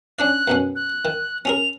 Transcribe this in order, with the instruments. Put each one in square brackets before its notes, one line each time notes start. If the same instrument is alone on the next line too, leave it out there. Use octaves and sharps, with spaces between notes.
[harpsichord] C#4 D4 D5 [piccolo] F#6
[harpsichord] F#2 B2 C#4
[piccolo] F#6
[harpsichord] D#3
[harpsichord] C#4 G#4 A#4 [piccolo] F7